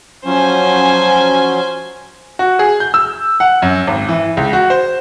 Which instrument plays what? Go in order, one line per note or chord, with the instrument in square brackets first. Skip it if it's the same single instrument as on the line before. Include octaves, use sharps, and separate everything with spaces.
[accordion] F3 F#3 C#4 [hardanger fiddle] C5 G#5
[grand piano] F#4
G#4
G6
E6
F#5
F#2
G#1
E3
C#2
F#4
C5